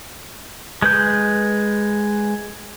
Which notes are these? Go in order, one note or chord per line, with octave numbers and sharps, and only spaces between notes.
G#3 B4 G6